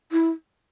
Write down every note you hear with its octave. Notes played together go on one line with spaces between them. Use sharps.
E4